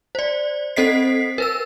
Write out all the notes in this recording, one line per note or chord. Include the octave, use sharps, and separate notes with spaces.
C5 D5
C4 A4 C5 D#5 B6 C7
A#4 B4 E6